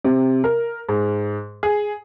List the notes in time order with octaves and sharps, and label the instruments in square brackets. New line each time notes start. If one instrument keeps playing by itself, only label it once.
[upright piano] C3
A#4
G#2
G#4